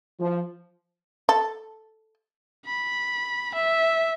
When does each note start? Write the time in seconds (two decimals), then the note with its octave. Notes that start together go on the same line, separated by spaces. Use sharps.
0.20 F3
1.29 A4
2.66 B5
3.54 E5